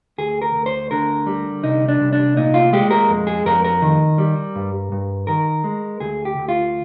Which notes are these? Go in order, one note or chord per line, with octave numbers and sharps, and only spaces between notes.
D2 G#4
A#4
D2
C5
D3 A#4
G3
C2 D#4
D4
C2
D4
A#2 D#4
F4
G#3 G4
A#4
F2
G#4
F2 A#4
A#4
D#3
G3
G2
G2
D#3 A#4
G#3
D2 G#4
G4
D2
F4